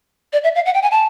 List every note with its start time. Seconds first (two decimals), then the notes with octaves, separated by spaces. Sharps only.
0.33 D5
0.44 E5
0.55 F5
0.66 F#5
0.74 G5
0.83 G#5
0.91 A5